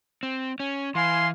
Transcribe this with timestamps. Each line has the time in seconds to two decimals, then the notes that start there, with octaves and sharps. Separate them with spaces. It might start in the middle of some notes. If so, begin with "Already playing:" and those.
0.23 C4
0.60 C#4
0.95 E3 F5 G#5 C6